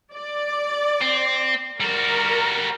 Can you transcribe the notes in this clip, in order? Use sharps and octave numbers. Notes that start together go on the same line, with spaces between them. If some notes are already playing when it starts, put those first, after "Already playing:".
D5
C4
G3 F#4 A#4